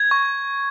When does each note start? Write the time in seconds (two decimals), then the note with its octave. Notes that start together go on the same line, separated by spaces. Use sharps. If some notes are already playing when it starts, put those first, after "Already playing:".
Already playing: G#6
0.11 C#6